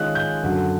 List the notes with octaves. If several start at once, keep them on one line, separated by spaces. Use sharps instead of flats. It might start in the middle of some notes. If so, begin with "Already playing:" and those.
Already playing: D#3 G#3 C#4 F4 F#6
G6
F#2 D3 F#3